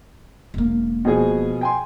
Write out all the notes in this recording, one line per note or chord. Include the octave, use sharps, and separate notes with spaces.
E1 A#3
B2 F3 G#4
G5 G#5 C6